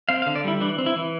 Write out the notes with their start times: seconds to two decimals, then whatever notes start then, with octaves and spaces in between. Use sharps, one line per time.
0.09 C4 F5
0.22 F5
0.26 D3
0.35 D5
0.44 G3 E4
0.60 E3 D4
0.78 C4
0.86 E4
0.96 E3